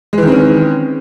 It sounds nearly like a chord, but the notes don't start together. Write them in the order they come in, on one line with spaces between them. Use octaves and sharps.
G#3 E3 D#3 C4 C#4